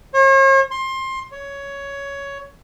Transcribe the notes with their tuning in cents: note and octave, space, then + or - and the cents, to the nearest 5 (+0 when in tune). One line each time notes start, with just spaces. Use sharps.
C#5 -45
C6 +20
C#5 +10